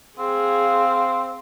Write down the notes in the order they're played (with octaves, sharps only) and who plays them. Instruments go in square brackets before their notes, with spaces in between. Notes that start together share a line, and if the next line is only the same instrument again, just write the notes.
[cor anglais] C4 [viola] G#4 [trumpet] F5